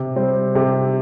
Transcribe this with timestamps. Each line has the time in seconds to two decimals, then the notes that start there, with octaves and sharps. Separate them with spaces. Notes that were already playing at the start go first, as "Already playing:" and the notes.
Already playing: C3
0.16 G3 C4
0.55 C3